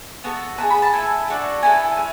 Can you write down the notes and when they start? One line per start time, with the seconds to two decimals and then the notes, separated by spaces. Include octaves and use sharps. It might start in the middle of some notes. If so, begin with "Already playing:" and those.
0.24 B3 F#4 A4
0.58 B3 E4 G#4 A5
0.70 B5
0.82 A5
0.93 A3 E4 A4 G#5
1.28 D4 F#4 A4
1.62 B3 E4 A4 G#5
1.97 A3 C#4